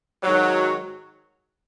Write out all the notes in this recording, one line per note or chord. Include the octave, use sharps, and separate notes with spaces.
G#2 D#3 F#3